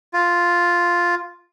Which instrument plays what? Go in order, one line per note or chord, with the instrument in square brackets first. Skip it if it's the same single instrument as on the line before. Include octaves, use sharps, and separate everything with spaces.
[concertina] F4